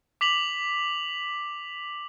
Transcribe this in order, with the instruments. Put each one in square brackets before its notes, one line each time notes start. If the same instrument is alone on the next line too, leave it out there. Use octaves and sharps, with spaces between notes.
[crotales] D6 B6 F7 F#7